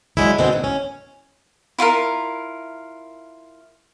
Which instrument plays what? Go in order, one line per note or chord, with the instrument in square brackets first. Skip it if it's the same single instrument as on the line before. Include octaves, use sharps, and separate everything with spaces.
[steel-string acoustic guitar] F#3 G#3 D4 E4
B2 D3 D#3 G#3 C4
A2
C#4
[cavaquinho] E4 F4 A4 A#4